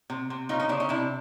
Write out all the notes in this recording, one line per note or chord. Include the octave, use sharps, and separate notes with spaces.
C3
C3
C#3 D#4 F4
C#4 D#4
C#3 C4 D4
C#4 D#4
C3 D4 E4